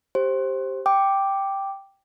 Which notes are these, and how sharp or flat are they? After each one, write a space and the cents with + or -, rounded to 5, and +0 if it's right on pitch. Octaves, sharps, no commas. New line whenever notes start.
G4 -5 C5 +15
G5 +0 D6 +0